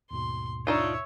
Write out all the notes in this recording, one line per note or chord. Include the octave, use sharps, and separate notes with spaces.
D#2 G#2 B2 C6
D4 D#4 F4 C#5 E5